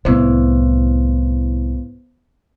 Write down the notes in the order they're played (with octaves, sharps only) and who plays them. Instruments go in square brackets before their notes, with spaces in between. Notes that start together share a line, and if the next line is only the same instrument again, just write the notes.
[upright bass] C2 A2 [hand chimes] B3 C5